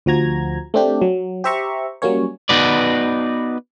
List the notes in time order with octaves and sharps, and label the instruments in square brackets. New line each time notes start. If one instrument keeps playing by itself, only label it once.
[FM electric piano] D2 F3 F#4 A#5 G#6
A3 C4 D4 G4
F#3
G4 C5 E5 A#5 C#6
F#3 G3 A#3 C#4 C#5
[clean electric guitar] B3 D#4 F#4 B4 D5